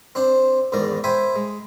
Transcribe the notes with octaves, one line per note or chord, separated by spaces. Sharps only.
C4 D4 C5
E2 G#2 D#3 A#4 D5
C5 E5 G5 G#5 B5
G#3